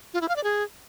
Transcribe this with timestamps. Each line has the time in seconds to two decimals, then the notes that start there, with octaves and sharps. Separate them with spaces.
0.14 F4
0.21 E4
0.29 F5
0.36 D5
0.44 G#4